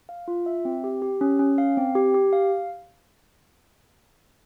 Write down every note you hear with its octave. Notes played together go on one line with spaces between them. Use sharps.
F5
F4
E5
C4
G4
G4
C#4
C#4
F5
C4
G4
G4
F5